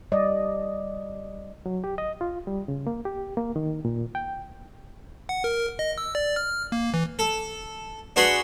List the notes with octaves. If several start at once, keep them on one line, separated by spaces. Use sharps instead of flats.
G3 D5 D#5
F#3
G4
D#5
F4
G3
C#3
A#3
G4
A#3
D#3
A#2
G5
F#5
A#4
D#5
E6
D5
F6
A#3
E3
A4
D4 F#4 G#4 B4 C6 C#6